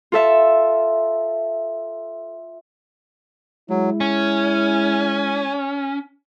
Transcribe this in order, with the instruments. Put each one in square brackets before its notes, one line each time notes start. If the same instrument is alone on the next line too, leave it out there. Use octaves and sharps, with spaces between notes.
[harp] F4 A4 E5
[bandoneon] F#3 [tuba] G#3 [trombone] E4
[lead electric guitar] C#4 [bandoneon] G#5